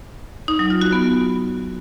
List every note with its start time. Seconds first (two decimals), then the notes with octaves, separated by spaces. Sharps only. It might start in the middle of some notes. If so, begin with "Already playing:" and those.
0.48 D#4
0.59 F#3
0.70 F4
0.81 F#4
0.93 B3